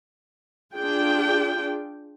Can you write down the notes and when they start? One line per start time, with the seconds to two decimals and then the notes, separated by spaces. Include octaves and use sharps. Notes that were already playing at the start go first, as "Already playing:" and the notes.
0.77 D4 F4 G#4 G5